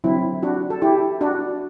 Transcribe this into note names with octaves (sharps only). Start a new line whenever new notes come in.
D3 F#3 C4 E4
D4 F#4
A4
E4 G4
D4 F#4